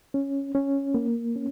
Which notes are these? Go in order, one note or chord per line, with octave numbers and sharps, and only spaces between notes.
C#4
C#4
A#3
C#4